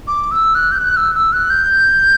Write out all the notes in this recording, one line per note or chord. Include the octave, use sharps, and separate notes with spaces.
D6
E6
F#6
G6
F#6
E6
E6
F#6
G6